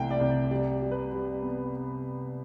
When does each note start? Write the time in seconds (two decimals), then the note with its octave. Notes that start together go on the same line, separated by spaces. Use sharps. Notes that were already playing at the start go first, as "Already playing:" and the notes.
Already playing: C2 E3 A3 E5 G5
0.11 D5
0.21 C2
0.31 D5
0.51 G3 D5
0.82 G3
0.91 B4
1.12 G3
1.42 B3